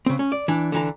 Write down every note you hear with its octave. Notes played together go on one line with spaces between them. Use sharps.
C#3 C4
C#4
D5
E3 D4
D3 E3 A#5